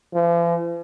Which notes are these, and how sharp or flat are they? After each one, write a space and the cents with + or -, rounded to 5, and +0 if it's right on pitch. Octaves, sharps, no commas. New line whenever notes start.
F3 -45